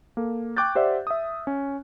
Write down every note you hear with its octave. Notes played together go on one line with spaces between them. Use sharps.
A#3 A4
G5 C#6 D6 F#6 G6 A6
G4 C5 D5 E5 F#5
E5 D#6
C#4